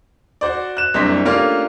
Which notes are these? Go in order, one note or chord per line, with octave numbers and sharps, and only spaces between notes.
F#4 C5 D5
F#6 E7
F#1 C2 D4 D#5 C6 B6
A3 A#3 C#4 D4 F4 G4